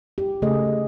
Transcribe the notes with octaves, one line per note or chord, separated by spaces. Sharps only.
G4
C#3 A3 G#4 D#5